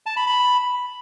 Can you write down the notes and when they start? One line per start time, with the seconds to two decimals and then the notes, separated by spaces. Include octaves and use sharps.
0.06 A5
0.16 B5
0.27 B5